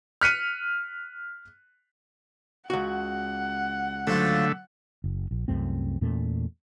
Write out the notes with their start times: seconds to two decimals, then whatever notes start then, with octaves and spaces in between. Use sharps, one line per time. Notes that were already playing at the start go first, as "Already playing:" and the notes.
0.21 F6 F#6 B6 C#7 D#7
2.70 C#2 F#4 F#5
4.07 D3 F3 F#3 A3
5.04 F#1
5.31 A#1
5.48 C2 F#2 A3 C4
6.01 E2 A#2 A3 C#4